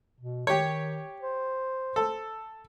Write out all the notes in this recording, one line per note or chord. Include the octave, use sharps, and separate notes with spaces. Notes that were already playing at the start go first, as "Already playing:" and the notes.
B2
D#3 G4 C#5
C5
A4